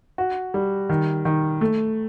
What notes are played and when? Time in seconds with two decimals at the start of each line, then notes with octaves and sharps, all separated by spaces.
0.18 F#4
0.54 G3
0.89 D#3
1.25 D#3
1.61 A3